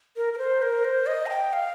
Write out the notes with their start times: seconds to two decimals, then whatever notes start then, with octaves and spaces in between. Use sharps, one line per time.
0.17 A#4
0.33 A#4
0.38 C5
0.62 A#4
0.85 C5
1.07 D#5
1.26 A#5
1.29 G5
1.53 F5